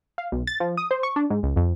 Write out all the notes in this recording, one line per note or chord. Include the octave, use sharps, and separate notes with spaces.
F5
B1
A6
F3
D#6
C5
C#6
D4
G#2
C#2
F2